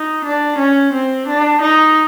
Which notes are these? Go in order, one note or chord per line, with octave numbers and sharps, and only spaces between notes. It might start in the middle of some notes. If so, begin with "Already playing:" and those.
Already playing: D#4
D4
C#4
C4
D4
D#4